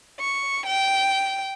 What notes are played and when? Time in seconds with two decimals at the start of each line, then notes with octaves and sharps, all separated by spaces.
0.20 C#6
0.67 G5